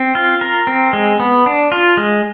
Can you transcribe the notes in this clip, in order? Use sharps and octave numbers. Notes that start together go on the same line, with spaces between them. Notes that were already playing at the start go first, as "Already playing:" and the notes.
Already playing: C4
F4
A#4
C4
G#3
B3
D4
F4
G#3